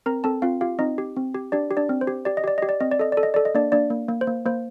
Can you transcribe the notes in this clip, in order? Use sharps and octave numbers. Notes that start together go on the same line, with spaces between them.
C4 A#4 A#5
C4 A4 A5
C4 F4 F5
F4 G4 F5
C4 D#4 D#5
G4
C4
G4
D4 G4 D5
G4
D4 D5
C4
C5
G4
G4 D5
D#5
G4 D5
G4 D#5
D5
C4 D#5
D5
A4 D#5
A4 D5
D#5
A4 D5
D#5
A#3 D4 D5
A#3 D4 D5
A#3
A#3
C5
A#3
A#3 C5